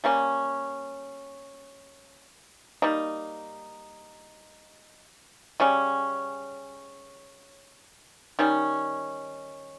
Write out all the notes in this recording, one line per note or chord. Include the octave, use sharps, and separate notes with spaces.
G3 A#3 C#4
G3 A#3 D#4
C#3 G3 C#4
D#3 G3 C#4